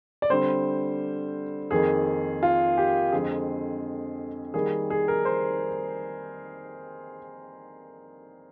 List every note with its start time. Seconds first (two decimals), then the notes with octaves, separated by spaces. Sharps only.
0.22 D5
0.30 D3 G3 C4 C5
1.71 F2 D#3 A#3 G#4
2.43 F4
2.77 G4
3.12 F2 D3 G#3 C4 G#4
4.54 D#3 G3 A#3 G#4
4.90 G#4
5.08 A#4
5.25 C5